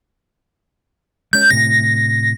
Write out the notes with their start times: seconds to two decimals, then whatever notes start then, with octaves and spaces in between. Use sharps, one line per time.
1.33 G#3 C#4 G6
1.51 A2 C3 A#6